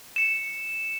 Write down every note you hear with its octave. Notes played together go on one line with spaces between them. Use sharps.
C#7 E7